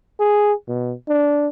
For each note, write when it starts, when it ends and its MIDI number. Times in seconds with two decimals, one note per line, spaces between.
0.20 0.53 68
0.68 0.93 47
1.09 1.48 62